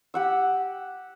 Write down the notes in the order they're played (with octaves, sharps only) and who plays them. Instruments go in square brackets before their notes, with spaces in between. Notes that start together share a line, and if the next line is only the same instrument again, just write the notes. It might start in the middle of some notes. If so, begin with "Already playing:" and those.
[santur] G4 F#5 E6